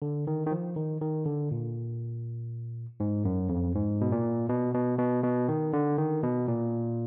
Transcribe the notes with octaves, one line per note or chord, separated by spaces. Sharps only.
D3
D#3
D#3
F3
D#3
D#3
D3
A#2
G#2
F#2
F2
G#2
B2
A#2
B2
B2
B2
B2
D#3
D3
D#3
B2
A#2